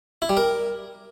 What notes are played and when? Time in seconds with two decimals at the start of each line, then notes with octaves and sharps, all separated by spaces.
0.22 E4
0.29 G3
0.37 A#4